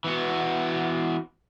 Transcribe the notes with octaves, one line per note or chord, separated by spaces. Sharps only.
E3 B3 F#4